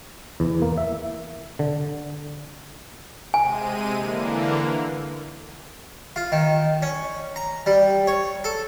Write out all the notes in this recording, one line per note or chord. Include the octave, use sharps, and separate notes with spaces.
E2
A#3
E5
D3
C3 G#3 G#5 D#7
D3 E3 A#3
F4
D#3
C#4
A#5
G3
C#5
A4